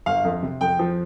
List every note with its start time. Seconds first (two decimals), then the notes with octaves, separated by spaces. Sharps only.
0.06 G1 F5
0.24 F2
0.43 C3
0.61 F2 G5
0.79 F3